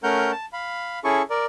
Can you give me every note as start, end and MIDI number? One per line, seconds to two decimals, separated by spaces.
0.03 0.31 57
0.03 0.31 61
0.03 0.31 70
0.03 0.31 78
0.03 0.31 89
0.03 0.31 91
0.31 0.46 81
0.53 0.99 77
0.53 0.99 83
1.04 1.22 61
1.04 1.22 64
1.04 1.22 68
1.04 1.22 69
1.04 1.22 85
1.30 1.46 70
1.30 1.46 74